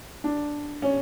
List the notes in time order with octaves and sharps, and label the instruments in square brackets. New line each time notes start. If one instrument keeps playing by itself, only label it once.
[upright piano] D4
C#4